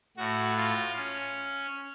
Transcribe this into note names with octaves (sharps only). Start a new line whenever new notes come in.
A2 F#4
F4
C#4